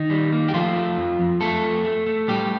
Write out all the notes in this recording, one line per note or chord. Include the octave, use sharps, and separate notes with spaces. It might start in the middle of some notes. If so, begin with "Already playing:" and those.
Already playing: D#3 D#4
G3
A#3
G4
F3 A3 F4
A3
F2
F2
F3 A3 A4
F2
A3
A3
A2 G3 G4